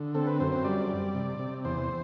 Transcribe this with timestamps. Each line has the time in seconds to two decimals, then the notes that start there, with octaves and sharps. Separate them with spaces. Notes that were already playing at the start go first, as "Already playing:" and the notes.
Already playing: D3
0.14 C4 A4
0.27 B4
0.40 F#2 C5
0.52 C5
0.64 G3 D5
0.89 G3
1.15 C3
1.39 C3
1.65 E2 C5